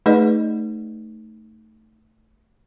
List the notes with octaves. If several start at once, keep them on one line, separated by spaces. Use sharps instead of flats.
A3 D#4 G#4 B4 D5 D#5